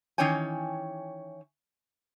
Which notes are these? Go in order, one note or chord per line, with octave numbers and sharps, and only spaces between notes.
D#3 E3 C#4 C#5 G5 G#5